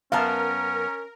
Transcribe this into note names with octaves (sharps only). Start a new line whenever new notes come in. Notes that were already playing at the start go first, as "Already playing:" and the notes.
F#2 B3 C#4 A#4 F5 A5 A#5